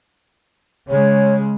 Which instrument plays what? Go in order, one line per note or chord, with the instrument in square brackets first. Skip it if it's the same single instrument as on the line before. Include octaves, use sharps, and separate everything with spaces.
[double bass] C#3 G#3 [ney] C#5